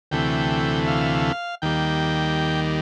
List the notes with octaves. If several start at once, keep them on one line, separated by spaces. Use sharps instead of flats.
D2 C3 E3 A3 G5
F5
D#2 D#3 G3 A#3 G5